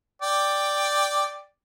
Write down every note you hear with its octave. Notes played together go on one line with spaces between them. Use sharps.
D5 G5